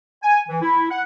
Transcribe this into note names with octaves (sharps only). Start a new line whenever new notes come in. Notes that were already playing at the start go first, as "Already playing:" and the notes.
G#5
E3
E4
F#5